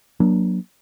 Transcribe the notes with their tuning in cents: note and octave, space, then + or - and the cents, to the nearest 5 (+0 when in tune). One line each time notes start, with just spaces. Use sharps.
F#3 +0 A#3 +30 D4 +0